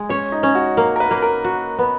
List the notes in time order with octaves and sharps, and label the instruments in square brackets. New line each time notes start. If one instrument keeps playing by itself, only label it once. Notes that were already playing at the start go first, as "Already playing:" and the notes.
Already playing: [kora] G#3
[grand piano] C#4 [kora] C#5
[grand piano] D#4
[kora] C#4
[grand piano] F#4
[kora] A#3 [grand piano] A#4
[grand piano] A#4
B4
[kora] A#3
[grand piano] A#4
[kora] F#4
B3